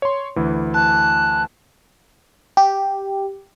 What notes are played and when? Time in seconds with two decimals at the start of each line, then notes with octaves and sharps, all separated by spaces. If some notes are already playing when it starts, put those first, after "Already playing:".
0.02 C#5 C6
0.36 D2 E3
0.74 A5 F#6
2.57 G4